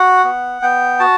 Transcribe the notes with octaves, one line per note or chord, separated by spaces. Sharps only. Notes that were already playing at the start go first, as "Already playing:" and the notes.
Already playing: F#4 F#5
B3
B3 G5
F#4 A5